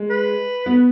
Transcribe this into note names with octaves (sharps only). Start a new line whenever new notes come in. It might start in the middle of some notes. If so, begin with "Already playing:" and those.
Already playing: G#3
B4
B3